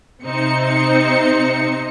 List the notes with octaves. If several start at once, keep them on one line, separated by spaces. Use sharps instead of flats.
C3 C4 D#4 C5 C#7